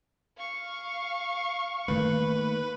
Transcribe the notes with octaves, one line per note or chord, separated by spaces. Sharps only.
F5 C#6
D#3 A3 A#3 B4